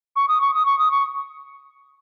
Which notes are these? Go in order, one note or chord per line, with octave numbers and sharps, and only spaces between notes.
C#6
D#6
C#6
D#6
C#6
D#6
C#6